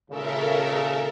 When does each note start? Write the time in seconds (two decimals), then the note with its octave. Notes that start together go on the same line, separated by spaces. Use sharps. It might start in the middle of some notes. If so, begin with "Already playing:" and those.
0.10 G#1 A#2 C#3 A4 A#4 E5